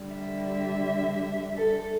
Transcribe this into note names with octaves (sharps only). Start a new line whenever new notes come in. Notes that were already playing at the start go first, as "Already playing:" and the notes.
Already playing: D3 G3
E5
A4